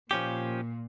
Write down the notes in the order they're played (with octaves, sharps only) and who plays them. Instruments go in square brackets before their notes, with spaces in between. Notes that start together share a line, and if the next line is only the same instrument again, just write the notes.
[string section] A#2 [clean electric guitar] F3 C#4 G4